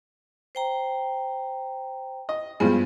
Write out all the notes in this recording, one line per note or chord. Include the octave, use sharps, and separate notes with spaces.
C5 G5 A#5
D#5
G2 F3 G#3 B3